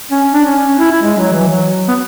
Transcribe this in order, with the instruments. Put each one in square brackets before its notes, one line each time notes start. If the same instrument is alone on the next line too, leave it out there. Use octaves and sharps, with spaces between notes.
[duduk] C#4
D4
C#4
C#4
E4
E4
G#3
F#3
E3
F#3
B3